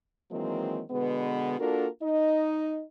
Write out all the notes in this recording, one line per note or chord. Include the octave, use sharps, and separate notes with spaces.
D#3 E3 F#3 G#3 A#3 C4
B2 D3 G#3 B3
A#3 D4 F4 F#4 A4 A#4
D#4 D#5